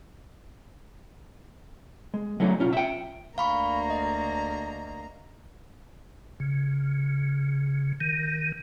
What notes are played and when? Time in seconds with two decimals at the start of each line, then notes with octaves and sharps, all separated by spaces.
2.14 G#3
2.40 F#3 A3 C#4 D#4
2.59 B1 C#4 F4
2.73 E5 G5
3.38 D2 A#3 F5 A#5 B5 C#6
3.90 D#5
6.40 C#3
8.01 D#3